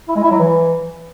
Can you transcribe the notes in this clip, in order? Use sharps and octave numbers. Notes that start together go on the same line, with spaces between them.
E4
G#3
E4
F#3
E3